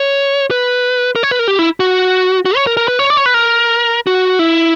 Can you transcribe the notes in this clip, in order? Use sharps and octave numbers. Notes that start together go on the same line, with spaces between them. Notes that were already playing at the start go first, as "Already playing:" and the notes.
Already playing: C#5
B4
A#4
C#5
B4
A#4
G4
E4
F#4
F#4
C#5
A#4
A#4
B4
C#5
D5
C#5
B4
A#4
F#4
E4